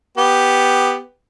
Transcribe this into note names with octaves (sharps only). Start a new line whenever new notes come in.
B3 G4